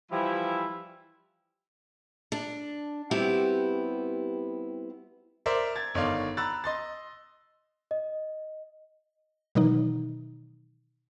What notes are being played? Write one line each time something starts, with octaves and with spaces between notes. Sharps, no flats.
E3 F3 G3 E4
D4
G3 B3 C4 E4 F#4 G4
A#4 C5 D5 E5
G#6 A6
G1 D#3 C#5 D5 F5 C6
A#5 B5 E6 F#6 A6
D#5 C6 A6
D#5
B2 D#3 E3 F#3 D#4